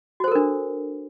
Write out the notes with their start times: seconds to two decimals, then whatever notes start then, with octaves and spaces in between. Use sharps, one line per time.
0.20 F#4
0.24 C5
0.28 A4
0.32 A#4
0.35 D4